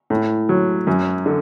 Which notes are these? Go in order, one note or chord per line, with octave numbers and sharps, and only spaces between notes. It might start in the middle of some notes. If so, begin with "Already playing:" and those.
A2
F#3
F#2
D3